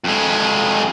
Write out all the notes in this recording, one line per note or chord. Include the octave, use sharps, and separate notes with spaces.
F2 G#3